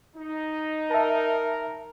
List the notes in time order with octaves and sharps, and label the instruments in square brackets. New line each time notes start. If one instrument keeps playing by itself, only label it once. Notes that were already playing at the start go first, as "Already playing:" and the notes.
[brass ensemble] D#4
[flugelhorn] A#4 [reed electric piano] E5 A5